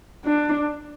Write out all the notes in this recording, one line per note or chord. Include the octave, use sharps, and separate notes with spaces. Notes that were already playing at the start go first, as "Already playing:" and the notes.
D4